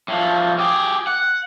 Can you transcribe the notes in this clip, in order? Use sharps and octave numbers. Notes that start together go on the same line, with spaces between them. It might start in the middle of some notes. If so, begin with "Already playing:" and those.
A2 F3
G4 G#4
F#5